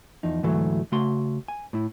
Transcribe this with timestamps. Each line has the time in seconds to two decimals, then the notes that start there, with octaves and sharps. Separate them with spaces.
0.23 E2 F3 D#4
0.43 D2 G#2 E3 F#3 A3
0.92 C#3 A3 F#4 C6
1.48 G#5
1.73 A2 E4